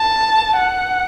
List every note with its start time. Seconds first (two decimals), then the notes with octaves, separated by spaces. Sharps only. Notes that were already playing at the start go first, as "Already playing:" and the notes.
Already playing: A5
0.56 F#5